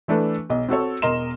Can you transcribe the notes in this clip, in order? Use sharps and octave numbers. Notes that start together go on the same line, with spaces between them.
E3 A3 D4 A4 B4
B1 D#5
C4 F#4 A4 C#5
E1 A#4 D#5 C6 E7